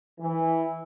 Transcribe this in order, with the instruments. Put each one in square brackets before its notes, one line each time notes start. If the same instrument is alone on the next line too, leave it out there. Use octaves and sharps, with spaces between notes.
[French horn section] E3